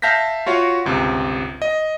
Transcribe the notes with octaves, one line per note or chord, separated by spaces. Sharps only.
E5 F5 A5 G6 A#6 B6
F4 F#4 C#5 F5
G1 C#2 C3
D#5